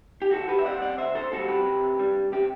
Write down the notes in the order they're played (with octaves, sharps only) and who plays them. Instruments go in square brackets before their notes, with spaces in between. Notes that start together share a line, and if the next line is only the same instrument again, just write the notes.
[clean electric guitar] G4
D3 F#4 A4
G4 B4
E5
G3 C4 D5 F#5
D5 F#5
D3 C5 E5
A4 C5
G3 C4 F#4 A4
G4 B4
C3
G3 D4
C3 G4